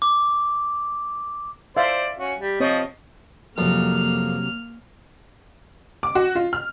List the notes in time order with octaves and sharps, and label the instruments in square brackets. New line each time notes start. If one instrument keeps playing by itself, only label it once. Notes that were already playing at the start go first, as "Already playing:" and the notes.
[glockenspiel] D6
[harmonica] C5 D5 [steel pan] E5 F5
[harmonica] C#4 F#4
G3
[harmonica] F3 D#5 [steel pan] C4 C#5
[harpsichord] F2 [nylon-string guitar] C3 F#3 A#4 [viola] A#3 [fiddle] F6
[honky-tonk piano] D6
F#4
F4
F6